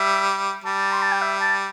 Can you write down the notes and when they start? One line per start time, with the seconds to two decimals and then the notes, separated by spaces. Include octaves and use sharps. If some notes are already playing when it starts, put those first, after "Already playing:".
Already playing: G3 E5
0.64 G3 A5
0.92 C6
1.02 A5
1.12 G5
1.22 E5
1.41 A5